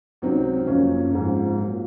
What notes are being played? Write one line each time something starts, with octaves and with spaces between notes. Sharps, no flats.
C#2 C3 F#3 C4 D#4
F#1 F#2 F3 A#3 C#4
G#2 F3 G#3 C4 D#4
A#2 F#3 A#3